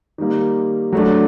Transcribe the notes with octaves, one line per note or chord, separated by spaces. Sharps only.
D#3 G3 A#3
F#3 A3 D4